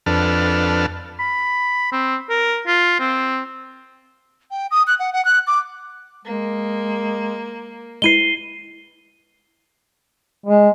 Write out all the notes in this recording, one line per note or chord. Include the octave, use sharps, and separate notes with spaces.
F2 D4 A4 B4 F6
B5
C4
A#4
F4
C4
G5
D#6
F#6
F#5
F#5
F#6
D6
G#3 A#3
G#3 E4 B4 C7 D#7 G7
G#3